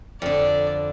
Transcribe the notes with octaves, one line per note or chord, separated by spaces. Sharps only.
F2 D3 D5